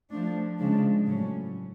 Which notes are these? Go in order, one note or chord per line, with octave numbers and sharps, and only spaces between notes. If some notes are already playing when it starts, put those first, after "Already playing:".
F3 A3 D4
C#3 F3 G#3 D4
A2 F#3 C#4